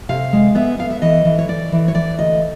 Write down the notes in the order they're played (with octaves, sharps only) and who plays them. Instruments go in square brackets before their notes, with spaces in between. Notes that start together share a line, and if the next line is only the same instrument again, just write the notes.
[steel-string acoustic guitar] C3 F5
G#3
B3 E5
B3 F5
E5
E3 D#5
E3
C#5
E3 D5
E3
C#5
E3 D5
D2 D#5